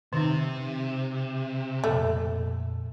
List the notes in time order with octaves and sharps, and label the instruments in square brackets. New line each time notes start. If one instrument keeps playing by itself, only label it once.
[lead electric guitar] C3 [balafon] D#3 D#4
[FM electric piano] F2 A#2 [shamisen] A3